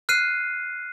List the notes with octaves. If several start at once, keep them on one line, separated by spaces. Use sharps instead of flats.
F6 F#6 C7 D#7